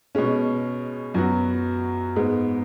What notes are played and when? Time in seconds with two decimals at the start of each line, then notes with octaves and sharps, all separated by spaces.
0.15 B2 G#3 C#4
1.14 F#2 F#3 B3 F#4
2.16 G#2 G#3 B3